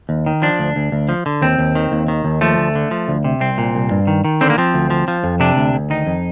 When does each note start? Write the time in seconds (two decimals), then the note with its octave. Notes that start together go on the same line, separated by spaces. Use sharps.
0.09 D#2
0.26 D#3
0.42 F3 D4
0.59 D2
0.76 D2
0.92 D2
1.09 F3
1.26 D3
1.42 D#2 C4
1.58 D#2
1.75 D#3
1.92 D#2
2.08 D#3
2.25 D#2
2.41 F3 A3
2.58 D2
2.75 D3
2.91 F3
3.08 D2
3.24 C3
3.41 C2 C4
3.58 A#2
3.75 C2
3.91 G2
4.07 D#3
4.25 D#3
4.41 D3 C4
4.50 A#3
4.58 F3 C4
4.74 D2
4.90 F3
5.08 F3
5.24 F2
5.40 C3 D4
5.57 D2
5.74 D2
5.90 D#3 D#4
6.06 F2